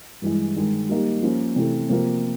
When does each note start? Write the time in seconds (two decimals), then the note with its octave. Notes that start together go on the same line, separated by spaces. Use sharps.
0.22 G2 E3 G#3
0.56 G2 D#3 G#3
0.89 G3 A#3 D#4 G4
1.22 F3 A#3 C#4 F4 A#4
1.56 C3 E3 A3
1.90 C3 F3 A#3